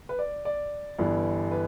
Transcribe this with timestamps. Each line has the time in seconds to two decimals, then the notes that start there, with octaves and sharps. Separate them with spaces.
0.09 B4
0.19 D5
0.45 D5
0.98 G1 G2 E3
1.51 B4